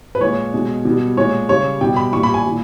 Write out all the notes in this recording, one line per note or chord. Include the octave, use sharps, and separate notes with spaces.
B4
A#2 G#3 C#5
B2 G#3
B2 G3
A#2 G#3 C#5
C#3 G3 C#5
B2 G3 G5
B5
A#2 G3 C#6
B5
G#5
A#2 G3